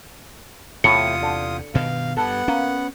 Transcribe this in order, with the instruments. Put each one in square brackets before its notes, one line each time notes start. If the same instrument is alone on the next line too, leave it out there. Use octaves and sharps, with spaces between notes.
[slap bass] E2 C3 [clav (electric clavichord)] A2 [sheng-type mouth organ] F4 D#6 [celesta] C#7
[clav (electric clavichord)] D3
[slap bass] G2 B2 D#3 [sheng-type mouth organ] F5
[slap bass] G2 [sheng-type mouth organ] B3 F#5 [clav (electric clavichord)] A4
[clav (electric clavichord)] A#3 [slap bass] C#4